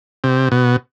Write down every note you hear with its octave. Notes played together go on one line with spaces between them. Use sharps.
C3
B2